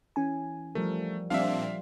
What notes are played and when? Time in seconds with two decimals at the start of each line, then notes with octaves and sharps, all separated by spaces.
0.16 E3 C#4 G#5
0.75 F3 G3 A3 A#4
1.30 A#2 F3 G3 C4 D4 F4 E5 F5